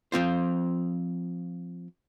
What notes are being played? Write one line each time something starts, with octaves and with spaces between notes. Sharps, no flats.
F3 C4 F4 C5